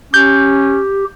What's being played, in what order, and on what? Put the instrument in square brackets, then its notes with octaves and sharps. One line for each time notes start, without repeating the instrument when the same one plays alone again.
[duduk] C#4 [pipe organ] G4 [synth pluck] G6